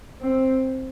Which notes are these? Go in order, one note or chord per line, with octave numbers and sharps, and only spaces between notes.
C4